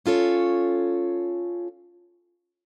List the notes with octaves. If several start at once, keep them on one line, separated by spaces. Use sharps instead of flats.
C#4 F4 A4 C#5